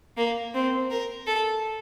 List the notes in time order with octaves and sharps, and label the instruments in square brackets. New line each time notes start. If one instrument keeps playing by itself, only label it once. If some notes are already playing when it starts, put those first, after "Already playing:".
[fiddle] A#3
C4
A#4
A4